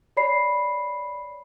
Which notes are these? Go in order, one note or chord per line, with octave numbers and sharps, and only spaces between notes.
C#5 D5 B5 C7